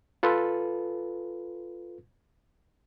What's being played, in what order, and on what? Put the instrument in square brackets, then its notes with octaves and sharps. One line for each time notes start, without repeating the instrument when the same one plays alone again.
[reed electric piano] F4 A4 B4